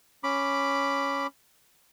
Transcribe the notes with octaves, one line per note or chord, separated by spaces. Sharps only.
C#4 B5 D6